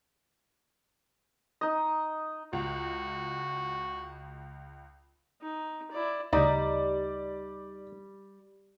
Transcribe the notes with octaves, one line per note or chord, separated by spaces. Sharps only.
D#4 D#5
C#2 F#4
D#4
E4 D5
D2 C#3 G3 D#4 D5